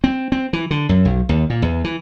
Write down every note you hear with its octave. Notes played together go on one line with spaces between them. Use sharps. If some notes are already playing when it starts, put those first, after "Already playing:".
C4
C4
E3
D3
F#2
B1
D#2
A#2
E2
E3